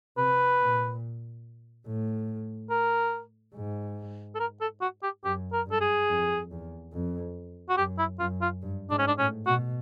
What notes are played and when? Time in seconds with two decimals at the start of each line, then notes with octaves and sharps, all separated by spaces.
0.17 C3 B4
0.60 A#2
1.87 A2
2.70 A#4
3.54 G#2
4.35 A4
4.40 A#4
4.61 A4
4.81 F#4
5.03 G4
5.24 F#2 G4
5.53 A#4
5.66 G2 A4
5.81 G#4
6.08 F2
6.51 E2
6.93 F2
7.69 F#4
7.77 F#2 G4
7.98 E4
8.20 F#2 F4
8.41 F4
8.62 G2
8.90 G#2 D4
8.99 C#4
9.07 D4
9.18 A2 C#4
9.46 B2 F#4